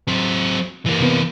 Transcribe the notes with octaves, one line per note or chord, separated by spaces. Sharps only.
F#3 C4
E3 A#3
C3 B3